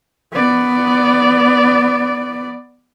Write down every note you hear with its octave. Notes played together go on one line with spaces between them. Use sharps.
B3 D5